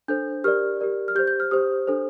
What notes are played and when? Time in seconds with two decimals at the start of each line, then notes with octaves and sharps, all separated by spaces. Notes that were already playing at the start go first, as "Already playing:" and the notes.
0.08 D4 A4 C5 G6
0.44 G4 A#4 D5 F6
0.80 G4 A#4 D5
1.08 F6
1.15 G4 G6
1.19 C5
1.28 G6
1.40 F6
1.51 G4 C5 D#6
1.87 D4 A4 C5